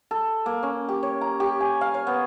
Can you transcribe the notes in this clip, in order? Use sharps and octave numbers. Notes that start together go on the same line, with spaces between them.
A4
A#3
C#4
G4
C#5
A#5
G4
G#5
F5
C#5
B3